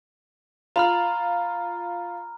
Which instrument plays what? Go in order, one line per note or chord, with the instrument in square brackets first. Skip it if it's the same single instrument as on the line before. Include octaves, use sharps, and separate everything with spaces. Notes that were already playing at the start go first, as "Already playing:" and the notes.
[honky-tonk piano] F4 [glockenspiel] A#5 B5 F6